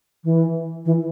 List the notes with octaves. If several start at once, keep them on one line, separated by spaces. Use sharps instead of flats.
E3
E3